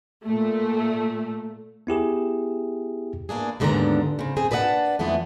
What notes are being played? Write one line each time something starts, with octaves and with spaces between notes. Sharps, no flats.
A#2 A3
B3 E4 G4 G#4
E2 A#3 D4 G#4
D#2 G#2 D3 B3 D4 A#5
C#3 C4
C4 G#4
D4 B4 D5 D#5 F#5 A5
F2 E3 G#3 A3 B3